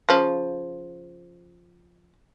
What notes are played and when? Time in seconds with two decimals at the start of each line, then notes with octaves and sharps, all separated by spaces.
0.09 C#3 F3